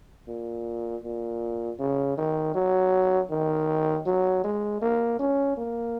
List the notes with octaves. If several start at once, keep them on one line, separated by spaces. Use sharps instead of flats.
A#2
A#2
C#3
D#3
F#3
D#3
F#3
G#3
A#3
C#4
A#3